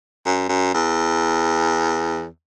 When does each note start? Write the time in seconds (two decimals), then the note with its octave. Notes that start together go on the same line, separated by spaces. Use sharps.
0.26 F#2
0.49 F#2
0.74 E2